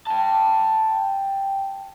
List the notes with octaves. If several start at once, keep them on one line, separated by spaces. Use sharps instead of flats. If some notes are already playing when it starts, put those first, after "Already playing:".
G5 A5